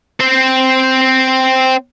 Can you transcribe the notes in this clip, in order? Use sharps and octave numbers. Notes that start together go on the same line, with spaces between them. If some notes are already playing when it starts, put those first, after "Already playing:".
C4 C5